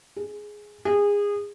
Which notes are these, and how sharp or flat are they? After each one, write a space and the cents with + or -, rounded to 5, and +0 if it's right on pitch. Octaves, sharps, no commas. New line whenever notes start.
G#4 +5
G#4 -25